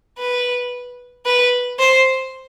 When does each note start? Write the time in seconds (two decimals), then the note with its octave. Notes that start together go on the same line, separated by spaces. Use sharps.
0.18 B4
1.26 B4
1.79 C5